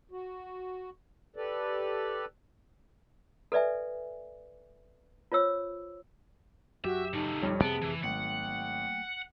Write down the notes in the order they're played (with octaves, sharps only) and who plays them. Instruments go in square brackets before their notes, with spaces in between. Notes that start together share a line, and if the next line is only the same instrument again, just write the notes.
[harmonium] F#4
G4 A4 B4 D5
[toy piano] A4 B4 D5 E5 G#5
F4 C5 C#5 E6
[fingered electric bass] F#2 F#3 [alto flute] F#4 [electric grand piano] G4 [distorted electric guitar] E5
[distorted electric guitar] C#3 A3 [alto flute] D#4
[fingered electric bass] D#1 B1 C4 [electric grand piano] F2 G3 C#5
[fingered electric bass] A1 F2 [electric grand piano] C3 A5 D7 [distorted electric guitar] B3 [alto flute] G#4
[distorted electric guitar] E3
[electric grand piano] G#1 [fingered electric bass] F#3 A3 A#3 [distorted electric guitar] F#5 [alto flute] G5